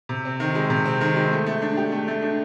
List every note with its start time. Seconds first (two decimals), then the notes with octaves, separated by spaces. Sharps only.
0.09 C3
0.25 C4
0.40 D#3
0.55 G#3
0.70 C3
0.86 C4
1.01 D#3
1.16 G#3
1.31 A3
1.46 A3
1.62 D4
1.77 G4
1.92 A3
2.08 A3
2.22 D4